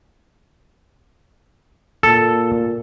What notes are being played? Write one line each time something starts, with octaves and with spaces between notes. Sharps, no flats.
A#2 A4